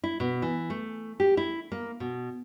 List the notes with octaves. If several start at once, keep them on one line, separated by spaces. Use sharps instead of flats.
E4
B2
E3
A3
G4
E4
A#3
B2